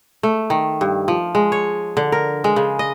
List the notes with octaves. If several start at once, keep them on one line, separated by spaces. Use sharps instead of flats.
A3
D#3
G2
F3
G#3
C#5
D3
A#4
G#3
C#3
D#5